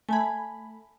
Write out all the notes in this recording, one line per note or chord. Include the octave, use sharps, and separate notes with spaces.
A3 G#5 A5 B5 G#6